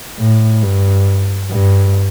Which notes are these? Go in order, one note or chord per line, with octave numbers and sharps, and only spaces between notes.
A2
G2
G2